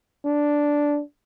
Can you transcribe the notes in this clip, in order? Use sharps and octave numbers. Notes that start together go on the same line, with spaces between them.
D4